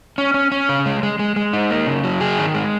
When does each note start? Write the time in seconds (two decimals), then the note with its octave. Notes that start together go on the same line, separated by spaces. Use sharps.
0.18 C#4
0.34 C#4
0.52 C#4
0.69 C#3
0.86 G#3
1.03 G#3
1.19 G#3
1.36 G#3
1.53 D#4
1.70 A#3
1.87 C#3
2.04 F#3
2.21 G#4
2.38 D#3
2.55 G#3